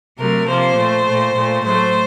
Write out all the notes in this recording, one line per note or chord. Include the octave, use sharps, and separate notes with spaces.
C3 F#3 A3 A#4
C3 F3 A#3 C5
A#2 A3
A#2 A3
A#2 A3
A2 F#3 A3 C5